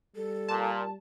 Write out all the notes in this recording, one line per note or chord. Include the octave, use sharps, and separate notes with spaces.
G3 A4
A#2 A5